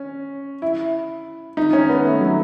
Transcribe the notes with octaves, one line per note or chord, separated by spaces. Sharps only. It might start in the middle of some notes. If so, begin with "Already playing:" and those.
Already playing: C#4
E4
D#4
C#4
B3
A3
F#3